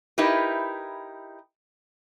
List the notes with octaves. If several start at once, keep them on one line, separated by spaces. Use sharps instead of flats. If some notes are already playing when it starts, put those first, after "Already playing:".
D#4 E4 G4 A#4 B4